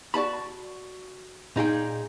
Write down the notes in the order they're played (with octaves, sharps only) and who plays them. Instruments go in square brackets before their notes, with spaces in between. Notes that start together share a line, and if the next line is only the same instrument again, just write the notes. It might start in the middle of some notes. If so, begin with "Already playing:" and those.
[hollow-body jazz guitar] F#4 D5 A5 B5
A#2 D#4 G#4 G5